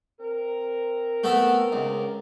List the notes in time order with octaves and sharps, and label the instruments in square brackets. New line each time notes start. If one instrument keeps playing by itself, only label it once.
[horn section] C4 A#4
[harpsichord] A3 B3 A4
C#2